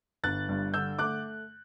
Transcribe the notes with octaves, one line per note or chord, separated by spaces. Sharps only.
G1 F#6 A6
G2
D3 E6 G6
A3 D6 F#6